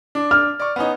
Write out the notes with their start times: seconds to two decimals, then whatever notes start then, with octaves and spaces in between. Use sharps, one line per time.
0.15 D4
0.31 F6
0.60 D5 C#6
0.76 B3 C#4 D#4